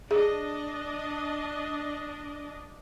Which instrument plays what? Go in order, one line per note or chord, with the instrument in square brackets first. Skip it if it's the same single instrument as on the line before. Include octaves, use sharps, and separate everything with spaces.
[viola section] D4 D#5 [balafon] G#4